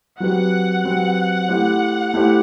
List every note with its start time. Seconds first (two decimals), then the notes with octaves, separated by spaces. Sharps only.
0.20 F#3 C4 G4 B4 F#5
0.84 F#3 C4 G4 B4
1.49 A3 E4 G4 C5
2.14 A3 E4 G4 C5